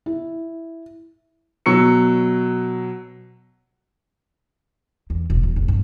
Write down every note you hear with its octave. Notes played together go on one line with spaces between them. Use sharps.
E4
B2 F#3 C#6 E6 C#7
E2
E1
D1
F1
G2